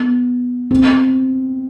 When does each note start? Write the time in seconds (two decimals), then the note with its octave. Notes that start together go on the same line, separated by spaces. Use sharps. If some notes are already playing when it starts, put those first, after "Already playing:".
Already playing: B3
0.71 C4